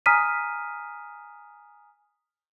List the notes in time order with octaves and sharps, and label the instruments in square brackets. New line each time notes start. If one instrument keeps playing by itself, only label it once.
[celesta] G#5 A#5 D#6 F6 B6 D#7